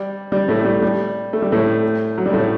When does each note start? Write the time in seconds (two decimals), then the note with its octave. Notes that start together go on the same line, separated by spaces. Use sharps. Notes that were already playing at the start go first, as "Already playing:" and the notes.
Already playing: G3
0.32 G3
0.48 A2 A3
0.65 G3
0.82 G3
1.33 A3
1.42 G3
1.52 A2 A3
2.18 F#3
2.26 G3
2.33 A2 A3